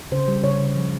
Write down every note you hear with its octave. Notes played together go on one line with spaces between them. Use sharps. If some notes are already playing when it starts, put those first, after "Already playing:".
C#3 C5
G3
C#3 C#5
C#3
F3